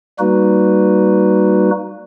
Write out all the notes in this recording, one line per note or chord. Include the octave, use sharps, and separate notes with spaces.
G3 A#3 D#4 F#4 B4